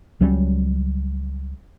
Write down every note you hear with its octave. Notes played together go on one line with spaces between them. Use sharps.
C#2 F#3 G3 C#4